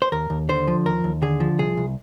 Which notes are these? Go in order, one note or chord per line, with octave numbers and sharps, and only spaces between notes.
C5
D#2 A#4
D#2
D3 C5
F3
D#2 A#4
D#2
D3 G#4
F3
C2 G#4
C2